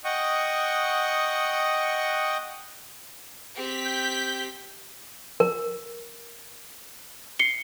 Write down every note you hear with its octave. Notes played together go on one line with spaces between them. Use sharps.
D#5 F#5 G5 C#6 D#6
C4 G4 B6
G6
A#4
C7 C#7 G7